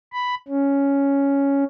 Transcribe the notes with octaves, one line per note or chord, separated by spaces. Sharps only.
B5
C#4